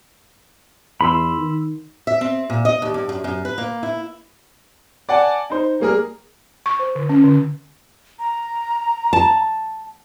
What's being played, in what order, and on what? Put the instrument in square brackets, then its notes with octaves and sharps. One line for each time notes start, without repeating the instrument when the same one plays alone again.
[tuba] E2 [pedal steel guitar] B5 C6 E6
[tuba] D#3
[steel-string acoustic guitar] E5
C4
A#2
D#5
D#2
G2
F#2
F#2
B4
A#3
E4
[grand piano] D5 F#5 G#5 A5
D#4 C5
G3 A#3 G#4 A#4
[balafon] C#6
C5
D3
C#4
D3
[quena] A#5
[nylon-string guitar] A5